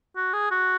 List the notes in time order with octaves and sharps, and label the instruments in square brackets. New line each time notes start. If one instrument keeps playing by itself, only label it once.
[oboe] F#4
G#4
F#4